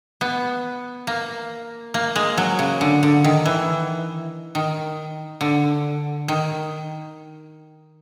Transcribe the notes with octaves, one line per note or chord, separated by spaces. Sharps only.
B3
A#3
A#3
G#3
F#3
C#3
D3
D3
D#3
E3
D#3
D3
D#3